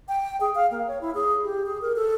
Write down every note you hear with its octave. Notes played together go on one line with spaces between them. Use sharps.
G5
G#4
F5
A#3
C#5
E4
G#4
G4
G#4
A#4
A4